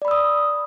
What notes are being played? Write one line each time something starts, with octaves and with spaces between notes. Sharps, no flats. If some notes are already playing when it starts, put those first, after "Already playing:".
D5 B5 D#6 E6